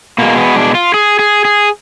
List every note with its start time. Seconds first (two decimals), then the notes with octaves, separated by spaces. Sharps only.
0.18 B2 G#3 A#3
0.37 B3
0.56 D4
0.75 F4
0.94 G#4
1.19 G#4
1.45 G#4